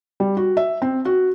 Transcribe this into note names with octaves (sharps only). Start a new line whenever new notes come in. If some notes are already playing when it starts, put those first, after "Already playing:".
G3
F#4
E5
C4
F#4